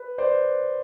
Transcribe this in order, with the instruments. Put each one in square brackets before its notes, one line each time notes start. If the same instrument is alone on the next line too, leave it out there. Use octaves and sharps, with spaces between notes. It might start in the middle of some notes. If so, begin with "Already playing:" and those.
Already playing: [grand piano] B4
C5 D5